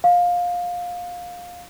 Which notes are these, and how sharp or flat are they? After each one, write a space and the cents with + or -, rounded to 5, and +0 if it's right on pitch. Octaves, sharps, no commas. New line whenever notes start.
F5 +20